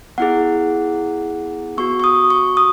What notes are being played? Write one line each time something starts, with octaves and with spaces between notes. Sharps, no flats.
B3 E4 G#4 F#5
B3 F#4 C#6
C#6
D#6
C#6
D#6